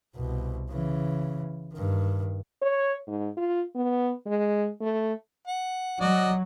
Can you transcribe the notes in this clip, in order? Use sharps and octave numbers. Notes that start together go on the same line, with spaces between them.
C2 B2
C#3 E3
G2 D#3
C#5
G#2
F4
B3
G#3
A3
F#5
F#3 F#4 D5 D#5